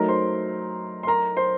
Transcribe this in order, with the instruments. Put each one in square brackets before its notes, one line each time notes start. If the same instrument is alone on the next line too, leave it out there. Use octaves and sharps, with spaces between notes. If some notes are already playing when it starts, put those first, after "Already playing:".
Already playing: [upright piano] F#3 A3 D#4 [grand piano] A#4 A#5
[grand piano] C5 C6
C6
A#4 A#5
C5 C6